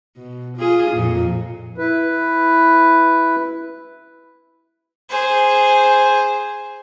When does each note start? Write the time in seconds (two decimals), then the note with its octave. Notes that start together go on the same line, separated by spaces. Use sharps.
0.17 B2
0.58 F4 G#4
0.92 F2 A#2
1.78 E4 B4
5.09 G#4 C5